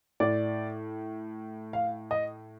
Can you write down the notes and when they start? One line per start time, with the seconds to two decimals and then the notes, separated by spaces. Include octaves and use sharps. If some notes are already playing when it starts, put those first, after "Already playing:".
0.20 A2 D5
1.73 F5
2.11 D#5